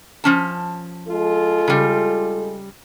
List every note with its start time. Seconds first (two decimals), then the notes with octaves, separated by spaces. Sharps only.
0.24 F3 C#4 A5
1.08 G#3 F4 A4
1.68 C#3 G3